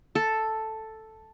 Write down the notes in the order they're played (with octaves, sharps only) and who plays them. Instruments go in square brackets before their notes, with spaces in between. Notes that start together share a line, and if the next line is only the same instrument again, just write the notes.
[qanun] A4